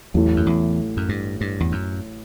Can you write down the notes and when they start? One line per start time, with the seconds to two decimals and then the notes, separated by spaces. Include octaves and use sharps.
0.14 A1 E2 A2 F#3 A3 E4
0.36 F#2
0.46 E2
0.97 F#2
1.09 G2
1.41 G2
1.60 E2
1.72 F#2